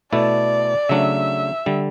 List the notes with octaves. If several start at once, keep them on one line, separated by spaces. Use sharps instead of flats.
B2 A3 E4 A4 D5
C#3 F#3 A3 D4 E5
D3 G3